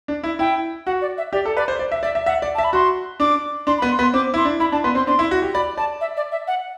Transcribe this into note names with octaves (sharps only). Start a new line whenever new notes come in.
D4
E4
E4 G5
F#4 F#5
D5
E5
G4 D5
A4
B4 D5
C5
D5
E5
D5 E5
E5
E5 F#5
D5
E5 A5
B5
F#4 C6
D4 D6
D4 C6
B5
B3
C6
B3
C6
C4 D6
E4 C6
D4
E4 B5
D4 A5
B3 C6
C4 C6
D4 C6
E4
F#4
G4
D5 B5
D5 A5
E5
D5
E5
F#5